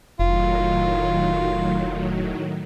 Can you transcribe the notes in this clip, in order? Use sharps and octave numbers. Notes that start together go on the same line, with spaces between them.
F1 A2 D#3 F#3 F4